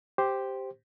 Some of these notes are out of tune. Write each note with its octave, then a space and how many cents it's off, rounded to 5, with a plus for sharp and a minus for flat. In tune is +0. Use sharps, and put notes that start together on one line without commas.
G4 +0 C5 +0